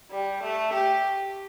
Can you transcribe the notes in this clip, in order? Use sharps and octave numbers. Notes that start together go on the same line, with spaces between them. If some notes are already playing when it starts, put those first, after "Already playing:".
G3
A3
G4